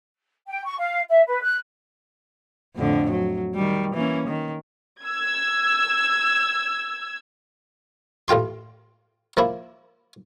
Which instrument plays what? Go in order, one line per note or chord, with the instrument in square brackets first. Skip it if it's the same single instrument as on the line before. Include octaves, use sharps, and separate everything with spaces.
[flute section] G5
C#6
F5
E5
B4
F#6
[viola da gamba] F2 A2 D3
F#3
D#3 G3
E3 A#3 C#4
D#3
[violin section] E6 G#6
[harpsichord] A1 A3 F4 G5 C6
F3 A#3 E4